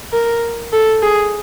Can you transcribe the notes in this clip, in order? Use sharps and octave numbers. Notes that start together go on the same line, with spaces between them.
A#4
A4
G#4